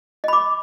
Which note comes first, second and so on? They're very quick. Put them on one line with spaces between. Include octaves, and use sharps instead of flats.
D#5 B5 D6